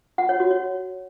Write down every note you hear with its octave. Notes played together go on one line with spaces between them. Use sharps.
F#5
C#5
F#4
C#5